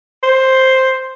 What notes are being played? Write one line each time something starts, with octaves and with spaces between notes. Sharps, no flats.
C5